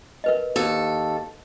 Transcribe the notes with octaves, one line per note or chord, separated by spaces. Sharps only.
A#4 B4 D#5
D#2 A4